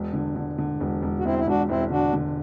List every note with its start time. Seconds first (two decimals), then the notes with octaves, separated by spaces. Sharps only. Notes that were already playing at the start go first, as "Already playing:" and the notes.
Already playing: E1
0.13 D3
0.36 D3
0.58 D3
0.80 E1
1.02 E1
1.19 F#4
1.24 E1 C4 E4
1.38 E4
1.47 E1 D4 F#4
1.68 E1 C4 E4
1.90 D3 D4 F#4
2.13 D3